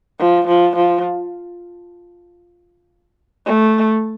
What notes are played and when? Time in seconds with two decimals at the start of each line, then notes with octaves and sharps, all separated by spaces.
0.19 F3
0.48 F3
0.76 F3
3.46 A3